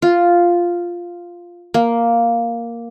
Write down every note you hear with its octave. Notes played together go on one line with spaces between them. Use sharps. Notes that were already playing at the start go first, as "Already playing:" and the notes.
F4
A#3